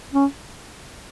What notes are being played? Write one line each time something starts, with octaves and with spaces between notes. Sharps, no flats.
C#4